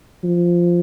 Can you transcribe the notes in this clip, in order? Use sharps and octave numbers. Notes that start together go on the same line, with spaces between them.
F3